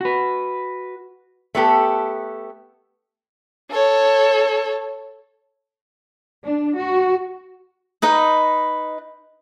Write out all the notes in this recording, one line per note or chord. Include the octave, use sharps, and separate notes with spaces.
F#4 B4
A3 B3 G4 A4
A4 C#5
D4
F#4
D#4 B4 D#5